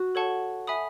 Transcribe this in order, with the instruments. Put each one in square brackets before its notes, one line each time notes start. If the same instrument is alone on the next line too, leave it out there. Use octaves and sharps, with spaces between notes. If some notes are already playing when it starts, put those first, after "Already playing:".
Already playing: [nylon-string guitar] F#4
[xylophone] A4 C#5 F#5 A5 C#6
E5 G#5 B5 D#6